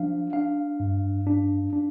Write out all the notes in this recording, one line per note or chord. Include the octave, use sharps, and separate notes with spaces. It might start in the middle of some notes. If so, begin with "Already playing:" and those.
Already playing: F3 D4 F5
D4 F5
G2
D4
D4